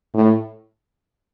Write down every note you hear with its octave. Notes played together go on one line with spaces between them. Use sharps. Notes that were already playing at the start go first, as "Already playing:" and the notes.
A2